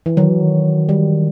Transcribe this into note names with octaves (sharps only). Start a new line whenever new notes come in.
E3
D#3 F#3
E3
D#3
G3